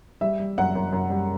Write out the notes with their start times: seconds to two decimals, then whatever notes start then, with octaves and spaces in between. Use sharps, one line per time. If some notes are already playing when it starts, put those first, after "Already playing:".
0.21 G3 E5
0.39 G3
0.58 F#2 F#5
0.75 F#2
0.93 F#2
1.10 G3